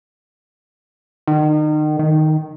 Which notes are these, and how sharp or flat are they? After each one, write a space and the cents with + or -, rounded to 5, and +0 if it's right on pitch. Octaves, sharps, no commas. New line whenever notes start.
D#3 -35
D#3 +0